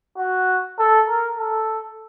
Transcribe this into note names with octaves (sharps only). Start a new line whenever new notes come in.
F#4
A4
A#4
A4